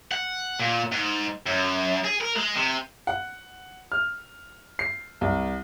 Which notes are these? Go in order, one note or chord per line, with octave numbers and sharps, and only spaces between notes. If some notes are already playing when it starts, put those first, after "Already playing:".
F#5
A#2
G#2
F#2
G#4
A#4
G#3
C3
F#5
F6
C7
C2